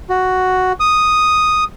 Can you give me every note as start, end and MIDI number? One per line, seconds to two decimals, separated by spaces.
0.09 0.72 66
0.80 1.64 87